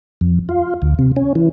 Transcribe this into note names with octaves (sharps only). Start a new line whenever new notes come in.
F2
F4
D2
C3
C#4
E3